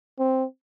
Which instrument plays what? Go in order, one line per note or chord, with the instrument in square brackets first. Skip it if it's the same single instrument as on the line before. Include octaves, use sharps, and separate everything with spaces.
[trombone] C4